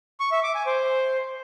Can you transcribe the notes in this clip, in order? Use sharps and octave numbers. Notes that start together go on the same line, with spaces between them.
C#6
E5
D6
G#5
C5